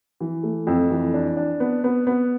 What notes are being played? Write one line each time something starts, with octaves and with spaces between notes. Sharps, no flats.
E3
A3
F2
E3
D4
D4
B3
B3
B3